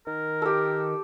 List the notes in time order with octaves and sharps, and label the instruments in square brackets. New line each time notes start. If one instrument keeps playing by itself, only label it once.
[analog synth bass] D#3 [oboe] A#4
[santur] G4 A4